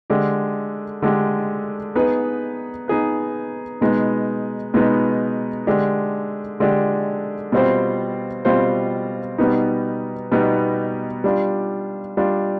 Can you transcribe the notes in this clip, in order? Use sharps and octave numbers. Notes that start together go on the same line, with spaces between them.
D3 G#3 D4 G4
D3 G#3 D4 G4
B3 D#4 G#4 B4
B3 D#4 G#4 B4
B2 G#3 B3 D#4
B2 G#3 B3 D#4
D3 G#3 D4 G4
D3 G#3 D4 G4
B2 G3 C4 F4 C5
B2 G3 C4 F4 C5
B2 G3 B3 D#4
B2 G3 B3 D#4
G3 D4 F4
G3 D4 F4